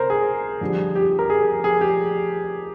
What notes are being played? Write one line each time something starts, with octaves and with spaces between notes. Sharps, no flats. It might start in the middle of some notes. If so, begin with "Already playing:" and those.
Already playing: C3 A#4 C5
G#4
F2 D3 G3
G4
A#4
G#4
G#4
G4